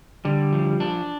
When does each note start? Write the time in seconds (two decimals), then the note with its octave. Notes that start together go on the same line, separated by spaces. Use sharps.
0.25 D3 G3
0.53 F3
0.80 D4